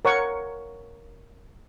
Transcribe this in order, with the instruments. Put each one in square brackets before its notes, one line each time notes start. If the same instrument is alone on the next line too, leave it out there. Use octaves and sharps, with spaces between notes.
[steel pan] A#4 C#5 F#5 C#6